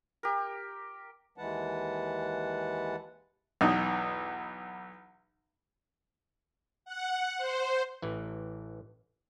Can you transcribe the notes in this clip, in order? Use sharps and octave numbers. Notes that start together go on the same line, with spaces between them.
G4 A#4
D#2 E3 G#3 B4 F#5 A5
B1 E2 D#4
F#5
C5
A1 E3